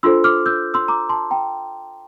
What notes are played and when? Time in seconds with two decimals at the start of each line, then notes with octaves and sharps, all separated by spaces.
0.03 D4 F4 A4 C5 C6 E6
0.24 D6 F6
0.46 E6 G6
0.74 C6 E6
0.88 A#5 D6
1.09 A5 C6
1.31 G5 A#5